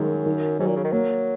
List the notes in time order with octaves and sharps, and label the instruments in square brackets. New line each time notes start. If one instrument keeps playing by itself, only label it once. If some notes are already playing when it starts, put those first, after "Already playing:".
Already playing: [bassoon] F#2 [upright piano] D#3 F#3 G#3
[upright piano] D#3
[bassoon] G#2 [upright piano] F#3
[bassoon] A#2
C#3
D#3
[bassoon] F#3 [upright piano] A#3